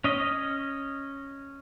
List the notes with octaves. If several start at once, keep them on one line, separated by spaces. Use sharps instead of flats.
C#4 D#5